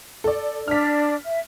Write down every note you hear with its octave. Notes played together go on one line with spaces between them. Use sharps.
A4 D5
D4 D5 F6 B6
E5